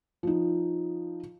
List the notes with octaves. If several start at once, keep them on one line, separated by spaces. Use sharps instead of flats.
F3 D#4